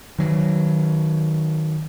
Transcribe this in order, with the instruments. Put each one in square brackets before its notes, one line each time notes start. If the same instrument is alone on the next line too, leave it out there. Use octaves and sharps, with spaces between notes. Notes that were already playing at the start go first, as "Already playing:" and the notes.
[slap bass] D#3 F#3